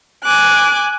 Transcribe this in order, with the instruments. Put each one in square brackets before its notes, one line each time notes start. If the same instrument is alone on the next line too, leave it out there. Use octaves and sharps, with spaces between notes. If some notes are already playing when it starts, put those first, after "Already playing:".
[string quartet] G#5 D6 F#6